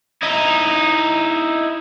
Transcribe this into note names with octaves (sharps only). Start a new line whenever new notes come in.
D#4 E4